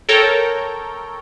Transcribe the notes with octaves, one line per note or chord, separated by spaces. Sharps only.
A4 A#4 C#5 G5 A#5